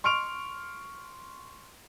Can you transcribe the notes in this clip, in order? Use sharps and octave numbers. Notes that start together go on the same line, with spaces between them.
C6 C#6 F6 D7 F7